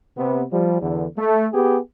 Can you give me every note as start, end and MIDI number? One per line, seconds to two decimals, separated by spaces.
0.16 0.42 48
0.16 0.42 59
0.51 0.77 53
0.51 0.77 55
0.80 1.05 40
0.80 1.05 50
1.16 1.46 57
1.52 1.77 59
1.52 1.77 67
1.52 1.77 68